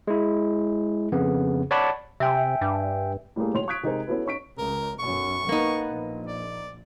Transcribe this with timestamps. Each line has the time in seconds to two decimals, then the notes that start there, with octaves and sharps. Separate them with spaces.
0.07 G#3 E4
1.12 F2 C#3 B3
1.71 C#5 D5 F#5 A5 B5
2.20 C3 E5 G5 G#5
2.61 G2
3.36 A2 G3 A3 A#3 G#4
3.54 B1 C#5 C6 F7
3.68 C#6 D#6 F#6 G#6 B6 D7
3.83 C3 G#3 D#4 G#4 A#4 C5
4.07 B3 C#4 E4 F#4 A4 B4
4.26 C#4 D#4 C#6 B6 D7
4.58 C#2 A#4
4.99 B1 F#2 C#6
5.49 A#3 B3 D#4
5.89 A#1
6.26 D5